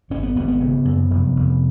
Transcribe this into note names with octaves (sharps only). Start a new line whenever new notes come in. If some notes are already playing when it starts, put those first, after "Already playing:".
G#1 C#4
B3
G#1 B3
B3
C#3
F#2
F1
F1